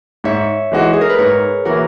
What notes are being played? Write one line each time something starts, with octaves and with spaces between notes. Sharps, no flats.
G#2 C#5 E5
E3 G#3 D#4 F#4
G#4
A#4
B4
G#2 A#4 C#5
E3 A#3 E4 F#4 A#4